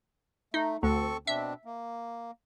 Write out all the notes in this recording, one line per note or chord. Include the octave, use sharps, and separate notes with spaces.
A3 D#4
D2 C4 A4 C#6
B2 C4 D4 E5
A#3